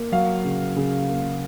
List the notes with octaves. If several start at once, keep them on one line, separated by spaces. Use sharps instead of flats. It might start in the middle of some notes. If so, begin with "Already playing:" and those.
Already playing: A#3
F#3 F5
C#3
C#3
A#3